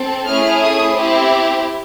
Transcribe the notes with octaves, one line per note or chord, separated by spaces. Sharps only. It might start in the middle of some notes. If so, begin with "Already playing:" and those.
Already playing: C4 A4
A3 C#4 E4 G#4 F6
D#6
C4 E4 G4